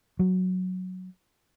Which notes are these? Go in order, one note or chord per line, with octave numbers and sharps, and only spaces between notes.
F#3